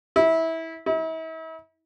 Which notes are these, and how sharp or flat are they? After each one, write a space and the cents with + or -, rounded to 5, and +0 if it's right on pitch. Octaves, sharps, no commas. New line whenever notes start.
E4 -20
E4 -40